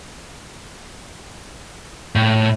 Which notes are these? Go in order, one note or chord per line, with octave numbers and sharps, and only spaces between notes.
A2